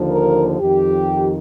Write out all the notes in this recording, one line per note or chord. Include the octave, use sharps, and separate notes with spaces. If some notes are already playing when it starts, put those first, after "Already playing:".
Already playing: D#2 D3 F3
A#4
F2 D#3 G4